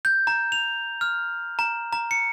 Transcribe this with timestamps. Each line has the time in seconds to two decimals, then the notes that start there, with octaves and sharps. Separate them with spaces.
0.05 G6
0.27 A#5
0.52 F7
1.01 F6
1.59 A#5
1.93 A#5
2.11 C#7